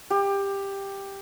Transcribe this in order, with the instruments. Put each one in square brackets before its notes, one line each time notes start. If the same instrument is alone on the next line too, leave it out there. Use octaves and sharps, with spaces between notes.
[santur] G4